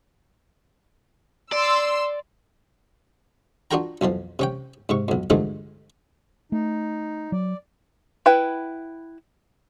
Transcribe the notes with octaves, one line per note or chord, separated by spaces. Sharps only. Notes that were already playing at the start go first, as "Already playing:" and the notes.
D5 C6 E6
D4 F4 F#4 A#4 G5 A#5
B1 F2 E3 F3
C3 C#4 G5
G#2 C3 C#6
B1 F2
G2 D3 E3 F3 G#3 A3
A3 D#4
F#3 D5
E4 B4 F#5 G5